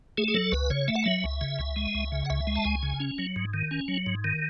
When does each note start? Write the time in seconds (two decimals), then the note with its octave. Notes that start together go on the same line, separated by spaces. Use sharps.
0.18 A3 G#4
0.28 G#4
0.34 F#3 A4
0.52 C#2 B4
0.70 C#3 C#5
0.88 A3 E5
0.95 F#5
1.04 F#3 E5
1.24 C#2
1.41 C#3
1.59 C#2
1.76 G#3
1.95 C#2
2.12 C#3
2.25 F#5
2.30 C#2 E5
2.47 G#3
2.56 A5
2.64 C#2 G#5
2.83 C#3
3.00 C#4
3.18 F#3
3.36 G#2
3.54 D#3
3.71 C#4
3.88 F#3
4.06 G#2
4.24 D#3